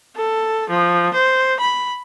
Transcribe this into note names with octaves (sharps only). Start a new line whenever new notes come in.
A4
F3
C5
B5